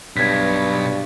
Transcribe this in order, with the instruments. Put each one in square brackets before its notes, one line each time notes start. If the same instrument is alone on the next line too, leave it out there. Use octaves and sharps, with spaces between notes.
[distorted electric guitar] B1 B2 [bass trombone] G2 [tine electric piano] G#6 B6